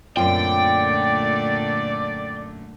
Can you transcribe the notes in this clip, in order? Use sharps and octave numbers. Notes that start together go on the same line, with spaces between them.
F#2 A#2 D3 A3 C4 F4 D5 G5